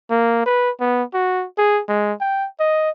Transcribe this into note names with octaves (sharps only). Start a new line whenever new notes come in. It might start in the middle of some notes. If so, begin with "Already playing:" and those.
A#3
B4
B3
F#4
G#4
G#3
G5
D#5